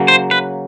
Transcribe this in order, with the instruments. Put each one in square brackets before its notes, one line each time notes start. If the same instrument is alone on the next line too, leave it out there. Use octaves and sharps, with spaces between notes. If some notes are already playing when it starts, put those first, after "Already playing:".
Already playing: [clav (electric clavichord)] C#3 F#3 A#3
[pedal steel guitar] C5
B4